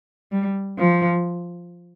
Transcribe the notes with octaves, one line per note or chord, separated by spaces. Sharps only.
G3
F3